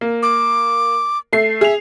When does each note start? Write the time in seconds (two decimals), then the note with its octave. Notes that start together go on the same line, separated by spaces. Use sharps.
0.01 A#3
0.23 D6
1.33 A3 C7
1.61 G#4 E5 F7